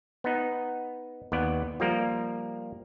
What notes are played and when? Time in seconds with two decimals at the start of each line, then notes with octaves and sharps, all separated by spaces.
0.24 B3 D#4
1.32 D#2 B3 D5
1.80 F3 G3 A#3 A#4